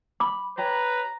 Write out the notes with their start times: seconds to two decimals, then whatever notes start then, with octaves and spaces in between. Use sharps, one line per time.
0.20 B5 D6
0.58 G4 B4 C#5 A5 A#5